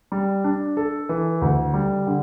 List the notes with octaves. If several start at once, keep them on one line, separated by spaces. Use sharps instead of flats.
G3
D4
A4
E3
D2
G3
D3